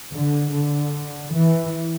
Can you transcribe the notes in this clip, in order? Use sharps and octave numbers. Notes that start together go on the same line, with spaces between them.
D3
D3
E3